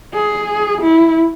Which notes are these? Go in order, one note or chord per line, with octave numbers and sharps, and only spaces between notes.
G#4
E4